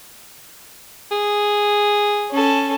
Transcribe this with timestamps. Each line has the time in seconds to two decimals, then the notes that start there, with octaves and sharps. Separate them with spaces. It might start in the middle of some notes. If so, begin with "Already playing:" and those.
1.12 G#4
2.31 C#4 A4